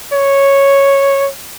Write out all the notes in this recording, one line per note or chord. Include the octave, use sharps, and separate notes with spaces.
C#5